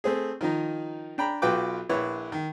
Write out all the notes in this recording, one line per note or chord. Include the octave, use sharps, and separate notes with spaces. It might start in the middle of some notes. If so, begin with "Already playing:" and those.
A3 C4 G#4
D#3 F3 D#4
D4 G5 A#5 B5
B1 F4 F#4 B4 G5 D6
A#1 E4 B4 C#5
D#3